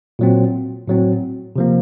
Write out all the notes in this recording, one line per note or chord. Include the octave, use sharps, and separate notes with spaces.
A#2 F#3 C4
A2 F#3 C4
C3 F3 A#3